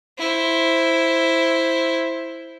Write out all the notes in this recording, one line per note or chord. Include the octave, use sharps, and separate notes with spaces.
E4 C5